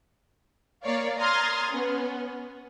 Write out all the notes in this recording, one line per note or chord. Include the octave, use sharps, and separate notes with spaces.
A#3 A#4 C#5 D5 F5
A#5 C6 D#6 F6 G#6 A6
B3 C#4